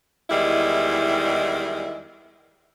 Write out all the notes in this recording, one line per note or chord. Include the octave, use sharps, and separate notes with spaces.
E2 D#3 G3 G#3 E4